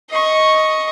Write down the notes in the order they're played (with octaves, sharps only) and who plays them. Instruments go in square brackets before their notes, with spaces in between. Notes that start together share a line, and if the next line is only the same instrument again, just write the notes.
[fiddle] D#5 C#6